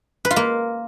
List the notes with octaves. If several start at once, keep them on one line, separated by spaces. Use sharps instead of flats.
B4
F4
A#3